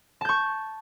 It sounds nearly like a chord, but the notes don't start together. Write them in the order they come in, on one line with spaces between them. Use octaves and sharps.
A5 G6 C#6